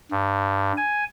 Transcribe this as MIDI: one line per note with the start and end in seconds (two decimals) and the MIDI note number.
0.11 0.72 43
0.77 1.04 80